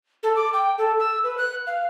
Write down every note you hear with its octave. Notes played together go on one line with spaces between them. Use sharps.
A4
D6
G5
A4
E6
B4
F#6
F5